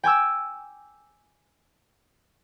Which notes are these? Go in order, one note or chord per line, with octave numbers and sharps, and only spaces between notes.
G5 G#5 D6 E6